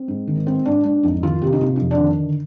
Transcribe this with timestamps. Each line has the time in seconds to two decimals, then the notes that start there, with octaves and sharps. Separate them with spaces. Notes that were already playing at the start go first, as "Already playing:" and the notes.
Already playing: C4
0.08 G#2
0.27 D#3
0.46 G#2 C4
0.66 G#2 D4
0.84 G#2 D4
1.03 F2 D#4
1.23 D#3 F4
1.42 C3 G4
1.53 D#4
1.61 C3 F4
1.76 F2 D#4
1.91 D4
1.99 D#3
2.19 D3